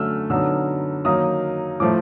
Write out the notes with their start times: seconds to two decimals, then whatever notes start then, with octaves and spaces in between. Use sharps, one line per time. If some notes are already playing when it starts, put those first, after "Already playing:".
Already playing: D3 F#3 A3 C#4 E6 F6
0.30 D3 F#3 B3 D#4 E6
1.05 D#3 F#3 A#3 D#4 D#6
1.80 A2 F3 A3 D6